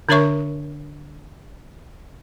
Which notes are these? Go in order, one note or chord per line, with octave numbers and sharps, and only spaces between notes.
D3 D4 A#4 C#5 E5 C#6